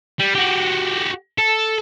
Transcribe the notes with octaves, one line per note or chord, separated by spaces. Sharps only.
G3
F#4 G4
A4